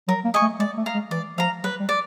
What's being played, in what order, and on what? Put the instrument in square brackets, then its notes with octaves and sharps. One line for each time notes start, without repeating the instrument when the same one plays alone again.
[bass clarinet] F#3 [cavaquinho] A#4
[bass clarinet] A#3
[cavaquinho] D#5 G#5 C#6
[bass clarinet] A3
[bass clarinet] G#3 [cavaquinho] D5
[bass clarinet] A3
[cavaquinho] F5 A#5
[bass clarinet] G#3
[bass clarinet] E3 [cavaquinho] D5
[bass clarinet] F3 [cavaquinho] F5 A#5
[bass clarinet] F#3 [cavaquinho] B4
[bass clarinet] G3
[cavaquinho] D5